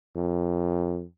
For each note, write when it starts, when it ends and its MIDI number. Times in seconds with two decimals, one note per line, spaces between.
0.16 1.04 41